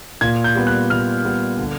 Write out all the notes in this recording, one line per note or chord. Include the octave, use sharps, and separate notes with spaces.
A#2 G#6
G6
G3 B3
F#6
A#2 F6
G3 B3
D3